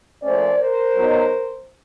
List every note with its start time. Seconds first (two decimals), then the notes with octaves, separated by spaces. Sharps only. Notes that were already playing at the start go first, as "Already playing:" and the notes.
0.23 A#2 F3 A3 C#4 C5 D5
0.59 A#4 C5
0.95 B2 F#3 B3 D#4